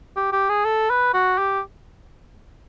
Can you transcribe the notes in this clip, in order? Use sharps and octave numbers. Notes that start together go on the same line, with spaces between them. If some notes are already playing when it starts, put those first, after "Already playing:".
G4
G4
G#4
A4
B4
F#4
G4